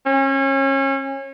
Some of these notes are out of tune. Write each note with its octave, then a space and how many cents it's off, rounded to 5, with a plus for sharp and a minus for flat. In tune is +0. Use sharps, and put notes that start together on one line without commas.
C#4 -30